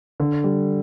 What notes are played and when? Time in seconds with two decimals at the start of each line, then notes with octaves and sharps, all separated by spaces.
0.20 D3
0.44 G3